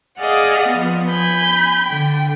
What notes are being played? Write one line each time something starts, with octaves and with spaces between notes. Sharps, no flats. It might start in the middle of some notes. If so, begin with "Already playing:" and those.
G#4 D5 D#5 F5 F#5
F3 B3
G#5 B5 G6
D3 G5